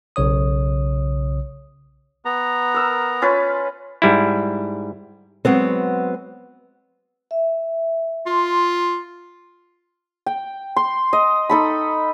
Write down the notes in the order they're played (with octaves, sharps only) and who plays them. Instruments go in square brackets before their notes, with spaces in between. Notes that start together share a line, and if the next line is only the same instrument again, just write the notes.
[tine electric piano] B1 C#3 C#5 D#6
[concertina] B3 A#5
[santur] A#4 E6
C#4 F4 B4
[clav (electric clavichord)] G#2 G3 E4
[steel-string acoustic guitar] F#3 G#3 B3 C4
[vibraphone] E5
[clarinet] F4 [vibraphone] C6
[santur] G5
C6
D#5
D#4 A4 B5